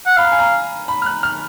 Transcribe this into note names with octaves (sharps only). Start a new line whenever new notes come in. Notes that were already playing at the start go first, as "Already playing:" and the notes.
F#5
F5 B5
A#5
G#5
A#5
B5
F6
F#6
F6